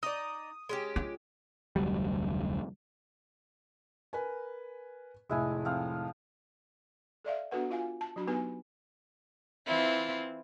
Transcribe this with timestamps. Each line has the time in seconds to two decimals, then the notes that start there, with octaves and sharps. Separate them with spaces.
0.03 D#4 D5 D#6
0.69 G#3 C#4 G4
0.96 F4
1.76 F1 D2 F#3 G3
4.13 A#4 B4 G#5
5.29 F1 A2 G#3 E4 G#5
5.65 F3 C4 F5
7.25 A4 D5 E5 F5
7.51 B3 D4 F#4 A4 B4 F#5
7.70 F4 F5 G#5
8.01 A5
8.16 F#3 D4 F#4 B5
8.27 B3 D#4 G4 B4 G#5
9.66 E3 C4 E4 F4